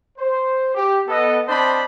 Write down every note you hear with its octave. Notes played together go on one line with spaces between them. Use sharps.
C5
G4
B3 A4 D#5
C4 D4 C5 D#5 A5 B5